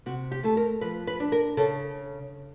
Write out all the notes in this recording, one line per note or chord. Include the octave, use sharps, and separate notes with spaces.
C3 F#4
G4
A3 A4
A#4
F3 B4
B4
D4
A#4
C#3 A4